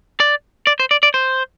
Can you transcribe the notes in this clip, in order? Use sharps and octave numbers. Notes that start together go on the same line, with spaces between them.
D5
D5
C5
D5
D5
C5